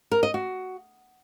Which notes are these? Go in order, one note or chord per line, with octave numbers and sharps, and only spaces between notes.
A#4
D#5
F#4